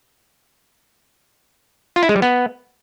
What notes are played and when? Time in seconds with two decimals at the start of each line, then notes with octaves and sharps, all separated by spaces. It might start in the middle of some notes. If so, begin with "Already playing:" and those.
1.96 F4
2.03 E4
2.09 G#3
2.16 G3
2.22 B3